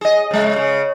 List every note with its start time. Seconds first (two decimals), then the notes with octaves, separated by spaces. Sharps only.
0.01 G#4 D#5
0.31 C#3 G#3
0.56 C#3